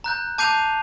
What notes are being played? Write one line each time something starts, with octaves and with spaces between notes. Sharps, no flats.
A#5 F#6 G6
A5 D6 G6 C7 D#7 F7